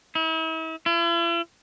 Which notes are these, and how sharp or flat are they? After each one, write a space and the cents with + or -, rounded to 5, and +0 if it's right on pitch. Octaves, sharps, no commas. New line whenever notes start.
E4 -40
E4 +45